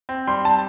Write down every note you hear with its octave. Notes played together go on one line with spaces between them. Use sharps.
C4
G3 C6
A5